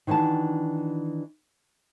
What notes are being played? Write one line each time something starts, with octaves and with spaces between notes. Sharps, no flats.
D#3 E3 D4 F#4 A5